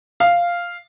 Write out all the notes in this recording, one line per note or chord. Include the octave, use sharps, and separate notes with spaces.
F5